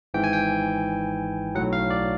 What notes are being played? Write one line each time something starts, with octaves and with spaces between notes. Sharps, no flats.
G#1 G#2 E3 G5
G#5
G5
B1 A2 F#3 F#5
F5
D5